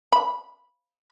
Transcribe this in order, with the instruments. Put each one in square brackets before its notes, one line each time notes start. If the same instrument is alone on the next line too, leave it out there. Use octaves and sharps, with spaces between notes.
[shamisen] B5